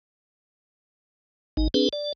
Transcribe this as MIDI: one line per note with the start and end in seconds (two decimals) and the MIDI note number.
1.57 1.68 32
1.57 1.68 63
1.74 1.89 60
1.74 1.89 62
1.74 1.89 68
1.74 1.89 71
1.93 2.13 74